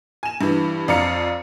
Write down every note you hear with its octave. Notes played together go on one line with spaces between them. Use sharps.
G#5 E7
G2 E3
F2 D5 F5 A#5 C#7